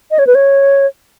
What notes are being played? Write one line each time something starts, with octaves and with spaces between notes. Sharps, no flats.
D#5
C#5
B4
C#5